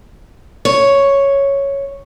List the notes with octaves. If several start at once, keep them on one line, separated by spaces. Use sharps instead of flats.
C#5